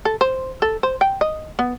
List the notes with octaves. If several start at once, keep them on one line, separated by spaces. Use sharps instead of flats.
A4
C5
A4
C5
G5
D#5
B3